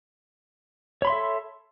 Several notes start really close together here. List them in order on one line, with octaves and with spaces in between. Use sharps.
C#5 B5 C6 E5 A4